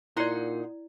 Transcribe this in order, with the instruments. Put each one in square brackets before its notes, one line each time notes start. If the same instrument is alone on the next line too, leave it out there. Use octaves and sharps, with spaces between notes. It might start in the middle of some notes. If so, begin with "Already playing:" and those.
[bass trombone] A#2 [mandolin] D#4 F#5 C6 [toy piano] E4 D5